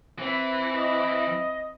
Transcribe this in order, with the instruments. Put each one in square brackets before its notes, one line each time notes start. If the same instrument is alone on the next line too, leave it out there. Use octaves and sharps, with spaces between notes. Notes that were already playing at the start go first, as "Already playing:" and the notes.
[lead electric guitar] E3 [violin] C4 E4
[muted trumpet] D#5